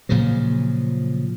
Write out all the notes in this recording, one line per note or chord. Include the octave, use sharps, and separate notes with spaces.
A#2 C#3 F3 F#3